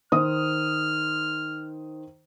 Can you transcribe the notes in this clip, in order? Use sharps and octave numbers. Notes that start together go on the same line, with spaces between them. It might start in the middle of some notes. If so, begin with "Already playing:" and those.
D#3 C5 D#6 F6